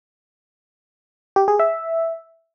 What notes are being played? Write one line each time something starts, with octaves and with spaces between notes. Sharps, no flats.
G4
G#4
E5